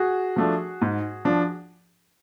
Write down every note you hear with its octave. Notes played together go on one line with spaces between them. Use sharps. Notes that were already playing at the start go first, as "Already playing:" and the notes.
Already playing: F#4 G#4
F3 A3 D4
G#2
F3 D4